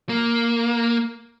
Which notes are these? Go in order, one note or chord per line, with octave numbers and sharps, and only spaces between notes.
A#3